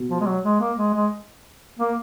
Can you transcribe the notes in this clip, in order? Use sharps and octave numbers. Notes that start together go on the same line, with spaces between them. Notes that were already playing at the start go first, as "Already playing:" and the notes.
Already playing: B2
F3
G#3
F#3
G#3
A#3
G#3
G#3
A#3